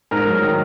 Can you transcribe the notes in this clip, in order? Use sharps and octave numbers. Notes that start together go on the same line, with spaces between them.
G#2 A#4
F#3
A#4
D#3